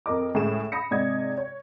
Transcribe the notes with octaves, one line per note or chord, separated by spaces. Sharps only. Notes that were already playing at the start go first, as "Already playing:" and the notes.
F2 A#4 D#5 D6
C#2 A2 G#4 E7
B5 D#6 A#6 C#7
G#2 C3 D5 D#5 D#6 G#6
C#5